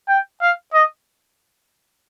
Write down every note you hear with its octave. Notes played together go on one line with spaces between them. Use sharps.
G5
F5
D#5